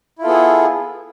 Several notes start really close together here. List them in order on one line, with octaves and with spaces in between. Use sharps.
E4 F4 A4 B3 G#4